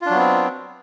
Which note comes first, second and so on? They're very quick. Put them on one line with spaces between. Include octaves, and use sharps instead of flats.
F4 D4 F#3 B3 C4